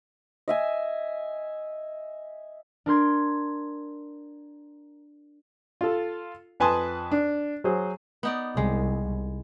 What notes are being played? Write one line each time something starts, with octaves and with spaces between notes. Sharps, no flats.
D#5 E5 G#5
D4 A#4 C6 G#6
F4 A4
F2 B4 G#5 A5 C6 D#6
D4
F#3 G#4 C5
B3 D#4 D5
C2 G#3